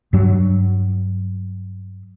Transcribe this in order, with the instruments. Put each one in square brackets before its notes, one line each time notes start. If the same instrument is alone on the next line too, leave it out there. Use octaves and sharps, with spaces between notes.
[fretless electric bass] G2 F#3